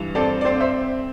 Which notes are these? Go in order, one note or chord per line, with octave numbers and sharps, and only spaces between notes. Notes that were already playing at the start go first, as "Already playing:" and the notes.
Already playing: G2 E3
C4 A4 D5
D5
C4 C5
C5 E5